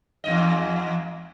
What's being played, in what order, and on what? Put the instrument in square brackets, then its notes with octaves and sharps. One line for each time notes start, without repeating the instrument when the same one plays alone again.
[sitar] E2 G#2 D#5